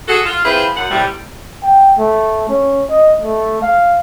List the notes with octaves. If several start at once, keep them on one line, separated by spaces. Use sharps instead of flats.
F#4 G#4 A4
F4
C4 E4 F4 G#4 B4 C5
F#2 F#5
A2 C3 G3
G5
A3
C#4
D#5
A3
F5